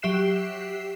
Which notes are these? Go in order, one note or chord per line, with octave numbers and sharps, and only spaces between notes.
F#3 G4 E5 F#6 C7 E7